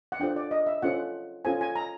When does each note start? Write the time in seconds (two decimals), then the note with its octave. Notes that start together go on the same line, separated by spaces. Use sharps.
0.12 F#5
0.20 D4 F4 A4 C5 G5
0.36 D5
0.51 D#5
0.66 E5
0.82 C#4 F4 A4 C5 F#5
1.45 C#4 F4 A4 C5 G#5
1.61 G#5
1.76 A#5